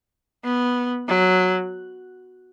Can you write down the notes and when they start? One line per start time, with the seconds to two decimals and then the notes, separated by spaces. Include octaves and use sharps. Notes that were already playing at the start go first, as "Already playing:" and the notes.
0.44 B3
1.09 F#3